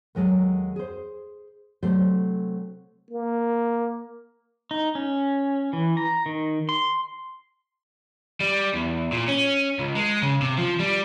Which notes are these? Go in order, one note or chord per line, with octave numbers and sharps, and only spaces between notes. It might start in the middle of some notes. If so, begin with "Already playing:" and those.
D#2 F#3 G#3 A4 A#4
G#4 C5
C3 F#3 A3 G4 A4 C5
A#3
D#4
C#4
E3
A#5
D#3
C6
G3
E2
A#2
C#4
C#2
G#3
C#3
C3
F3
G3